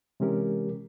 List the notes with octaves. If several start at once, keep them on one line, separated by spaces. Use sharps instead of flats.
C3 E3 G#3 C#4 G4 A#4